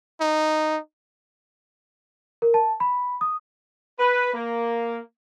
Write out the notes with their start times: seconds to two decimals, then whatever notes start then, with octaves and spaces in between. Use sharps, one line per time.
0.21 D#4
2.42 A#4
2.54 A5
2.80 B5
3.21 D#6
4.00 B4
4.34 A#3